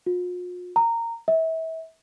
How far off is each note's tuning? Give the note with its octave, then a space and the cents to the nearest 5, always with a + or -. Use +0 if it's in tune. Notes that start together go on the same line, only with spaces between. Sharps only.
F4 +45
A#5 -15
E5 -30